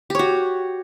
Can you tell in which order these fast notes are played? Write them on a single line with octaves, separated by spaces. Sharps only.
G4 C#5 F#4